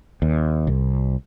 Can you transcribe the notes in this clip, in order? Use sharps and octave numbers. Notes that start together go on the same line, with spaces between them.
D#2
C2